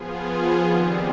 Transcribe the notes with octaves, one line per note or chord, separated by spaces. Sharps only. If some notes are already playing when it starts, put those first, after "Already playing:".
Already playing: F3 B3 F4 G#4
D#3 G3 C4